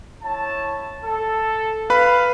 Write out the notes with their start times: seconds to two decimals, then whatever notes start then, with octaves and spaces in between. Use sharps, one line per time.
0.22 E4 C#5 A5
1.03 A4
1.90 B4 F5 B5